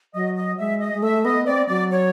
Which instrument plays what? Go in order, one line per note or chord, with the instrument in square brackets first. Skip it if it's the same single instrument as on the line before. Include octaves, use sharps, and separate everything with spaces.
[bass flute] F#3 [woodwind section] D#5
[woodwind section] D#5
[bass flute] G#3 [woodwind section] E5
[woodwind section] D#5
[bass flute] G#3
[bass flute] A3 [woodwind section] E5
[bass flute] B3 [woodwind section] D#5
[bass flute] C4 [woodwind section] D5
[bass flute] F#3 [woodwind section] D5
[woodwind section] C#5